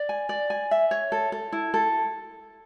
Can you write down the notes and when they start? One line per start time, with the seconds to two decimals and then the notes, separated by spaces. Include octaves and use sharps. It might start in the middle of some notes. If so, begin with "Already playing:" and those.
Already playing: D5
0.09 G#5
0.29 D5
0.50 G#5
0.71 E5
0.91 C#5
1.12 A4
1.32 A4
1.52 E4
1.74 A4